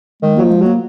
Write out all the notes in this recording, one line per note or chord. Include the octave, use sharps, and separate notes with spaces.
D#3 G#3
F3 F#3 A#3
G#3
F#3 A#3